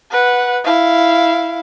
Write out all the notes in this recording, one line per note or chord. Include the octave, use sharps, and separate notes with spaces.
B4 F#5
E4 F5